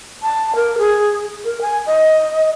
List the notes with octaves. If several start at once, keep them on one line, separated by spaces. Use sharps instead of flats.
A5
A#4
G#4
A#4
G#5
D#5